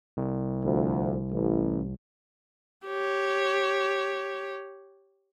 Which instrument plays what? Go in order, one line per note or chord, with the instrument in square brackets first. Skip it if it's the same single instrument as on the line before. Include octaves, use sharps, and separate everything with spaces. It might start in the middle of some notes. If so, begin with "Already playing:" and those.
[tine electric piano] C2
[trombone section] D2 F3
A1
[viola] G4 C#5